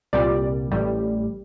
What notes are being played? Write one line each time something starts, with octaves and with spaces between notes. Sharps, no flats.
C2 A#2 G3 D5
A1 A2 G3